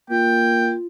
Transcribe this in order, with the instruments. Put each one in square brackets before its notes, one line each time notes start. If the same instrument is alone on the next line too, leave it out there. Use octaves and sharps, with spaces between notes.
[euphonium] A#3 [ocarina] F4 [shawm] G5